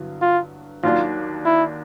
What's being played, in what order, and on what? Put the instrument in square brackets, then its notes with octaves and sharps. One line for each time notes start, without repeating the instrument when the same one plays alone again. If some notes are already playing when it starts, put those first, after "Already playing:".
Already playing: [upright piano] G2 D3 F#3 B3 E4
[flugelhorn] F4
[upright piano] D#2 D#3 F#3 A#3 D4 [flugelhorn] F4
[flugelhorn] E4